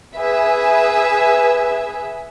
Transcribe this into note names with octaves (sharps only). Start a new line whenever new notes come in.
G#4 B4 E5